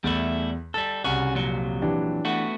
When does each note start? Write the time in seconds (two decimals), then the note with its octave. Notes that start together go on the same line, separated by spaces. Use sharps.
0.04 E2 G3 A3 E4
0.74 G3 A4 A6
1.04 C2 C#3 C#4 F#4
1.35 F2 A#2 F#3
1.82 E3 D4 G4
2.25 A3 B3 F#4